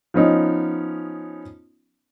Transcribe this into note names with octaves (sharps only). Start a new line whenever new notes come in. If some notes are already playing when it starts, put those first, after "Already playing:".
F3 B3 C#4 D#4